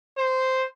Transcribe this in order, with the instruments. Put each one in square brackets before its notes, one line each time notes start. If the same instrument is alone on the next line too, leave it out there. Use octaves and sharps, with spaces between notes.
[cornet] C5